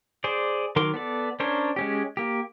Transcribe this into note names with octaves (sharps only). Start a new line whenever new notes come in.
G#4 C5 D5
D#3 F#3 A#4 C6 D6
B3 A4 D5
C#4 D4 A#4 C5 C#5
G#3 C#4 G4
A#3 G4